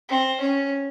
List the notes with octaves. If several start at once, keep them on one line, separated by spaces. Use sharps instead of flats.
C4
C#4